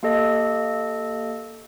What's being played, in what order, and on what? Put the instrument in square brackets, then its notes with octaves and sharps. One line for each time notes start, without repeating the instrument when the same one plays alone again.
[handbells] A#3 G4 A4 D#5